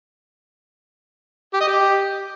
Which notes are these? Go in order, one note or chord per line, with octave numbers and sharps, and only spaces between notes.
G4
D#5
G4